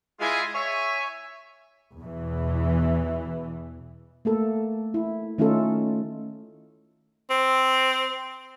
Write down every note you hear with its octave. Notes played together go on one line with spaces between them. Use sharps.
G#3 E4 F4 G#4 G#5
C#5 E5 G#5
E2 B2 E3
A3 A#3 A4
E4
D#3 A3 C#4 D#4 F4 A4
C4